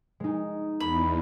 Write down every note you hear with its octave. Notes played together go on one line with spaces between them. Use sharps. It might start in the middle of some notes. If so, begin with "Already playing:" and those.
G#3 D#4
E2 B5